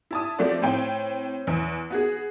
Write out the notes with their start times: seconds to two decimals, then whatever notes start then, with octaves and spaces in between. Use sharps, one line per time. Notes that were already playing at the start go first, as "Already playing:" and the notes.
0.11 E4 A5 D#6
0.39 F3 A3 C4 F#4 D5
0.62 A2 C4 G5
1.47 E2
1.90 B3 F#4 G#4